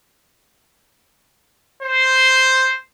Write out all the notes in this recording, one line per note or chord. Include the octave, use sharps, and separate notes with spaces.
C5